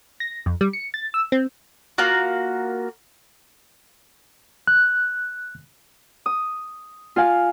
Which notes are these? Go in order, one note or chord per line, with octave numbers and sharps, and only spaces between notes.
A#6
F2
G3
C#7
A6
E6
C4
A#3 F4 F#4
F#6
D#6
F4 F5 G#5